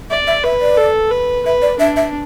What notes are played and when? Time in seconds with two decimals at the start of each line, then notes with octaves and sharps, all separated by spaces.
0.10 D5 E5
0.27 E5
0.44 B4 E5
0.61 D5
0.77 A4
1.11 B4
1.45 B4 E5
1.62 D5
1.79 D4 E5
1.96 E5